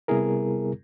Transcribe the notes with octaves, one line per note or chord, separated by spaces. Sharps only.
C3 G3 B3 E4 G#4 A#4